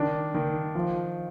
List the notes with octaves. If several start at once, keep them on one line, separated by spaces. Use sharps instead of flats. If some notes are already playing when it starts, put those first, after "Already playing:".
Already playing: D#3 D4
D#3
F3